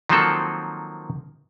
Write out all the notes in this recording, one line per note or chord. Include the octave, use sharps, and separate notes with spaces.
D#3 F3 F#3 A#3 C4 A4